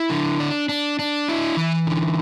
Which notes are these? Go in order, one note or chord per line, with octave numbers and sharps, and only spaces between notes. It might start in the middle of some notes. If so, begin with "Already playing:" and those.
Already playing: E4
D3
D4
D4
D4
E4
E3
D3